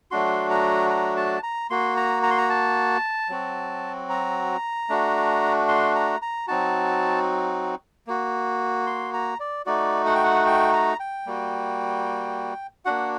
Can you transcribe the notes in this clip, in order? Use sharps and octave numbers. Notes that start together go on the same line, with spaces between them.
F#3 A3 D4 F#4 C6
A#5
A#5
A5
A#5
A#3 F#4 C6
A#5
A#5
C6
A#5
A5
F#3 C4 F#4
A#5
A3 D4 F#4
C6
A#5
A#5
F#3 C4 D#4 F#4 A5
A#3 F#4
C6
A#5
D5
A3 D#4 F#4 D5
F#5
G5
F#5
G5
A#5
G5
G3 A#3 F#4
A#3 D4 F#4 F#5